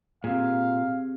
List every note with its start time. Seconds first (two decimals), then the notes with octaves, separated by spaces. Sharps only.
0.24 A#2 C4 G4 G#4 F5